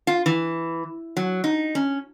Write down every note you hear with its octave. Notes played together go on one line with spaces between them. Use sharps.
F4
E3
F#3
D#4
C#4